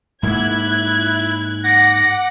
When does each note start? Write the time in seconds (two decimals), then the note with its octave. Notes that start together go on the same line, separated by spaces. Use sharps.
0.23 G#2 A#3 E4 F#6 G#6
1.64 F#5 D6 A#6